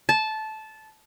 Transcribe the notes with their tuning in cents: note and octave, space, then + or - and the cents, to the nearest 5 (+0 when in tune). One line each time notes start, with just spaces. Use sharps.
A5 -15